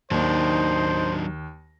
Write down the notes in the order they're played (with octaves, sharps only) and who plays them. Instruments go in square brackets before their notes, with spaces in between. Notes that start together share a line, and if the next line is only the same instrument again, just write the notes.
[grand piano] D#2 [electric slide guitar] F#3 D4 [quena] D#4 [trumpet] C5